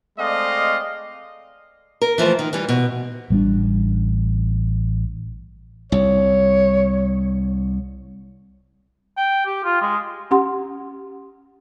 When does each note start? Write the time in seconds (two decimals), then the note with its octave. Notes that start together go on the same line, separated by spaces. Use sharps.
0.18 G#3 A3 C4 D5 D#5 F5
2.01 A#4
2.18 E3 F3 G3 A3
2.39 D#3
2.53 E3 G3
2.69 B2
3.30 A1 G3 A3 D4
5.92 C2 C#5
9.17 G5
9.46 G4
9.64 F4
9.82 G#3
10.31 C#4 G4 F#5 C6